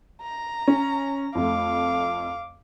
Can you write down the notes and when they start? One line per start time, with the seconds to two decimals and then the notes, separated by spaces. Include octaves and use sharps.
0.22 A#5
0.68 C#4
1.35 F2 A3 F5 D6